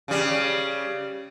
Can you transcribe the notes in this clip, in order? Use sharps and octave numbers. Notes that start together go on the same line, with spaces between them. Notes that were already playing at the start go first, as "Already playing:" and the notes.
C#3 G3